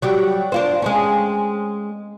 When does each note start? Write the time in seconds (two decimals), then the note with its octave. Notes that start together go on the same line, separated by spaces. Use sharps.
0.02 F#3 G3 G4
0.52 D4 F4 C5
0.82 G#3 C4 C#4